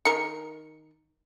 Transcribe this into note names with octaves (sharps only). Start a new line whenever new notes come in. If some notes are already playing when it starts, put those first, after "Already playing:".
D#3 A#4 C#7